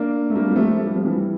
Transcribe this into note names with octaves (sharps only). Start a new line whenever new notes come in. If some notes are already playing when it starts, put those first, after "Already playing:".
Already playing: A#3 D4
A3
G3 A#3
G3
F3 A3
A3
G3
F3
E3 G3